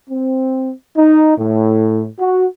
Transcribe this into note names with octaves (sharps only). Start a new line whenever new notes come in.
C4
D#4
A2
F#4